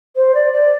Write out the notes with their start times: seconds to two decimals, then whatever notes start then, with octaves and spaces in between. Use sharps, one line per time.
0.16 C5
0.35 D5
0.53 D5